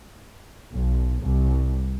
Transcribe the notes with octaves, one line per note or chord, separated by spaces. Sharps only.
B1
C2